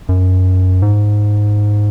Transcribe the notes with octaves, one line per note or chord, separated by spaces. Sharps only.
F#2
G#2